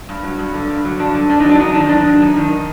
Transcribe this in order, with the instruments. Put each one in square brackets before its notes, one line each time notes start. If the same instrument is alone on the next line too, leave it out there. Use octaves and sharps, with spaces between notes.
[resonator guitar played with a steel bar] G2
F#3
G2
D3
G2
F#3
G2 D4
D3
G2 D4
D#4
F#3 D4
F#2 D#4
D4
D#3
D#4
F#2 D4
F#3
F#2 D#4
D#3